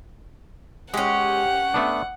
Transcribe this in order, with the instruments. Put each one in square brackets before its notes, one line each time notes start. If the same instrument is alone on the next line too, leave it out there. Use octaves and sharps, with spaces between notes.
[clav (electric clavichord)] G#3 [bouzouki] C#4 G4 [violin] F#5
[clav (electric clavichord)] A3 B3 D4